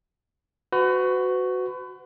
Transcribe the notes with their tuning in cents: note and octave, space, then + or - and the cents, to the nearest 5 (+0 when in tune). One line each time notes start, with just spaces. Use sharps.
F#4 +0 B4 +35